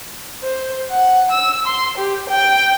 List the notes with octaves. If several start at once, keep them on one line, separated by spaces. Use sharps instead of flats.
C5
F#5
E6
C6
G4
G5